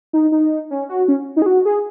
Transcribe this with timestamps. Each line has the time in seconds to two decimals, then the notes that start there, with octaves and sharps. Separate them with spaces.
0.13 D#4
0.32 D#4
0.71 C#4
0.89 F#4
1.08 C#4
1.36 D#4
1.42 G#4
1.46 F#4
1.65 G#4